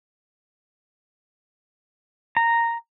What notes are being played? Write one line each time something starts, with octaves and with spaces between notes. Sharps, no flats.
A#5